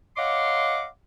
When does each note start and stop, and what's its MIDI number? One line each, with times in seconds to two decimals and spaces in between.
0.17 0.86 73
0.17 0.86 75
0.17 0.86 77
0.17 0.86 78
0.17 0.86 84
0.17 0.86 86